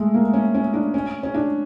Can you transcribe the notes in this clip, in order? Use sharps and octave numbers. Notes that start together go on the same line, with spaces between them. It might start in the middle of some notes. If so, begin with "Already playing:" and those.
Already playing: G#3 A3
A#3
C#4
C#4
D4
C#4
C#4
D4